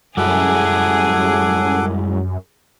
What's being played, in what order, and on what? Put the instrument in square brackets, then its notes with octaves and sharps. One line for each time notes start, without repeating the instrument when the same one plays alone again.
[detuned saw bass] F#2 [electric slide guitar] G3 G#3 E4 [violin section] G#4 [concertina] A4 F#5 D6